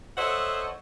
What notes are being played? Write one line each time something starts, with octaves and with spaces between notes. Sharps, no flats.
A4 C5 C#5 D#5 E5 F#5